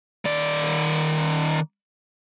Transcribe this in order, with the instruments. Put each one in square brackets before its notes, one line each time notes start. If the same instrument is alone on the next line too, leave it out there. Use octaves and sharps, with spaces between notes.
[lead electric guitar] D#3 D5